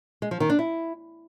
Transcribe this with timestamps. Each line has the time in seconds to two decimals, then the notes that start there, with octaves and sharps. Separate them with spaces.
0.22 G#3
0.31 F3
0.40 D#3
0.50 D4
0.59 E4